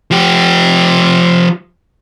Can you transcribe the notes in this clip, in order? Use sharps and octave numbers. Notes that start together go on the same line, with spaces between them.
F3 G4